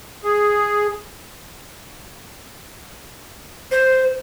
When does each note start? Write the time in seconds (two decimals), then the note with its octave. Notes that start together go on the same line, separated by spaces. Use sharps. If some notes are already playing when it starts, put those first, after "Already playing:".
0.24 G#4
3.71 C5